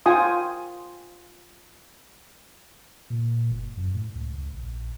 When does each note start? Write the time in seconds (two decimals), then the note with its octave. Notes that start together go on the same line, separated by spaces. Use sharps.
0.06 F4 G5 G#5 D#6
3.10 A#2
3.51 F#1
3.77 F#2
3.94 A2
4.15 C#2
4.38 C#2
4.54 A#1